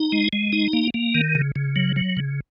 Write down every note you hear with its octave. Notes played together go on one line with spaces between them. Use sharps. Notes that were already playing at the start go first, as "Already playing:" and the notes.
Already playing: D#4
G#3
G#3
D#4
A#3
A#3
D#3
C#3
C#3
F#3
F#3
C#3